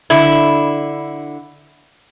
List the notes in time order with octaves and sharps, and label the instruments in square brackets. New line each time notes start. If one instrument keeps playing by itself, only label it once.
[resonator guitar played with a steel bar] D3 E4